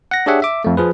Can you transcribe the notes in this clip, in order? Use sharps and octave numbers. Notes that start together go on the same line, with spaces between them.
F#5 A#6
D4 G4 G#4 C#5 E5 F#5
E5 D6
F2 A3
F3 G#4 B4